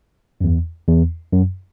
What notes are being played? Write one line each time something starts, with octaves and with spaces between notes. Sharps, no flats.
F#2
E2
E2
F#2